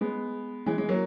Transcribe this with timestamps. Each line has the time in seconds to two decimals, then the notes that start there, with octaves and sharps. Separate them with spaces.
0.01 G#3 B3
0.66 E3 G#3
0.78 E3 G#3
0.89 F#3 A#3